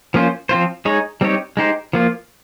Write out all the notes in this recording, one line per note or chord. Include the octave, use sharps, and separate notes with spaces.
F3 A#3 C#4 F4 C5
F3 C4 F4 C5
G#3 D#4 G#4 C#5
G3 C4 D#4 G4 C#5
G#3 D#4 G4 C5
F3 A#3 F4